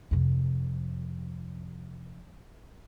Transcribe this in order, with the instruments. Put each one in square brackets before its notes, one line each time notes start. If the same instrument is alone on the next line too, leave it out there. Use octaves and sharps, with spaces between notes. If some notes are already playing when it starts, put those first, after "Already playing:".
[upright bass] F2 C3